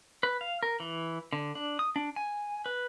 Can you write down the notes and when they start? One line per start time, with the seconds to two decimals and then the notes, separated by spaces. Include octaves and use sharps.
0.23 B4
0.41 F5
0.63 A#4
0.80 E3
1.33 D3
1.55 D4
1.79 D#6
1.96 D4
2.16 G#5
2.66 B4